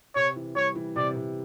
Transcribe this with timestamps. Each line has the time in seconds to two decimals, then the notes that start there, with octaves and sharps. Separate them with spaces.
0.15 C3 C#5
0.36 E3
0.55 G3 C#5
0.75 E3
0.96 C3 D5
1.16 C3